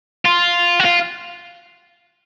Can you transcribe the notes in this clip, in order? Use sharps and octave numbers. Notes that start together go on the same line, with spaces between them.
F4
F#4
F4